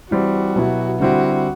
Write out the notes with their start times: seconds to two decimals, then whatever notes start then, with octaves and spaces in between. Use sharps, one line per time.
0.10 E3 G3 C4 F#4
0.55 B2 F#3 B3 E4 G4
1.00 D3 G3 C4 E4 F#4